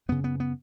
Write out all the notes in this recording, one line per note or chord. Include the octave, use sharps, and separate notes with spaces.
F#2 C#3 B3
B3
B3